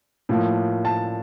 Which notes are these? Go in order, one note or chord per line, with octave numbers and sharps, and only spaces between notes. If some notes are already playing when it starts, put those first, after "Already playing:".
A2 F3 A#3
A5